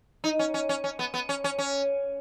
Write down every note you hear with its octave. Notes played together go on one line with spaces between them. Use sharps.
D#4
C#4
C#4
C#4
C#4
B3
B3
C#4
C#4
C#4